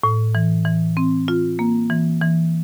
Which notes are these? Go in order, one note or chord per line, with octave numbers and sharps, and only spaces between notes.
A2
E3
E3
C4
F4
A#3
E3
E3